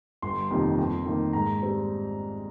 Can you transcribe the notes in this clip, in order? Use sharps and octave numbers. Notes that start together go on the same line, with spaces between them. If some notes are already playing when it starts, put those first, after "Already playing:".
G1 C6
F2 C3 D#3 A#3
F2
D#3 A#3
G#2 A#5
G3 C4